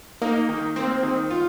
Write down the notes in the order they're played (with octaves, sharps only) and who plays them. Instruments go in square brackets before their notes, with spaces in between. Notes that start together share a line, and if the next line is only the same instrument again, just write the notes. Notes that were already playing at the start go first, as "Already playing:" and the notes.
[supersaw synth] A#3 [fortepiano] D#4
[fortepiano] D#3
[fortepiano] A#3 [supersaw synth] C4
[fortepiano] D#3
F4